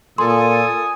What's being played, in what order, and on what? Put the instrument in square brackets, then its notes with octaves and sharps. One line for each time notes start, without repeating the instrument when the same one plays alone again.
[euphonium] A#2 [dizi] A4 [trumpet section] G#5 D#6 [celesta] C6